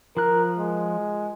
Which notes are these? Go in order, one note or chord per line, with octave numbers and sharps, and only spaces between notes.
F3 A#4 F#6
G#3